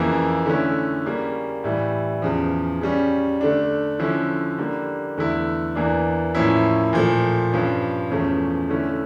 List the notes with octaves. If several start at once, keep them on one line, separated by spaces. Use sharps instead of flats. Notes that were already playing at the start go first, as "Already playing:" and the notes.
Already playing: F2 C#3 E3 A#3
D3 A3 C#4 E4
C#3 G3 A#3 C#4
A2 E3 G3
E2 C#3 F3
C#3 G3 C#4
D3 A3 D4
D3 F3 C#4 E4
D3 G3 A#3
E2 D3 A3 E4
E2 E3 A#3 D4
A2 F3 A#3 C#4 E4
A#2 F3 A3
G2 F3 C#4
E2 C#3 F3 A3 C#4
D3 A3 C#4 E4